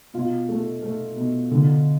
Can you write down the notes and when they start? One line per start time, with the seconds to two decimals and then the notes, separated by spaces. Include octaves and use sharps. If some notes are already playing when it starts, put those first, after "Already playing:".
0.14 B2 F4
0.49 A3
0.82 A3
1.17 B2
1.51 D3